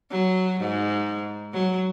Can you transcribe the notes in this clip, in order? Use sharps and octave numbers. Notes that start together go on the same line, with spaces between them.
F#3
G#2
F#3